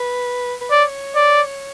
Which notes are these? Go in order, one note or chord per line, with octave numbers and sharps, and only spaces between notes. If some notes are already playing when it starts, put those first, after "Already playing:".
Already playing: B4
B4
C#5 D5
D5